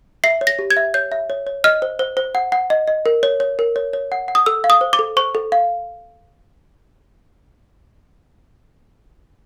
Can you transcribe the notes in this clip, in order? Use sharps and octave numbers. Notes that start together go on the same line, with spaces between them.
E5 C7
C#5
A#6
G4
G#6
E5
C#5 G6
E5
C#5
C#5
D#5 F6
C5
C5
C5
F#5
F#5
D#5
D#5
A#4
C#5
C#5
A#4
C#5
C#5
F#5
F#5
D#6
A4 E6
F5
D#6
C5
D6
A4
C5 C#6
A4
F5